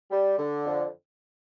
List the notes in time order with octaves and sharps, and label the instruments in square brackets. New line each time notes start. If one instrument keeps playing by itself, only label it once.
[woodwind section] G3
D3
F2